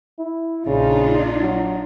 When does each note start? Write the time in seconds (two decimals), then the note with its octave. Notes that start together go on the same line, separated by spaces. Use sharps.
0.19 E4
0.67 A#1 C#3 D4 D#4 F4
1.41 F#3